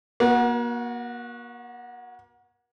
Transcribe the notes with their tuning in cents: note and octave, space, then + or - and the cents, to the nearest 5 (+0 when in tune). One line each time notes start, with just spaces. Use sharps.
A#3 +35 F#4 -15